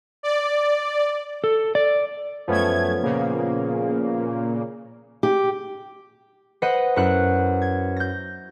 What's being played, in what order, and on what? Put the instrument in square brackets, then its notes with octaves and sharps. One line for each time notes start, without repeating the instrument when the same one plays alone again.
[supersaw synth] D5
[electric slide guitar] A4
D5
[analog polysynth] F#2 A3 G#6 [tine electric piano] F3 B3 C#4
[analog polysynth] A#2 C#3 A#3
[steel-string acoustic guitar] G4
[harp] B4 C5 D#5 F#5 D#6
F#2 E4 F#5 F#6
G#6
G6 A#6